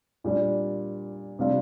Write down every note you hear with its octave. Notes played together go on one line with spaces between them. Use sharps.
A#2 G3 D4
C3 G3 D4 F4